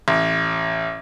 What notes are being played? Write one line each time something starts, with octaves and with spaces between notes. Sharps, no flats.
A1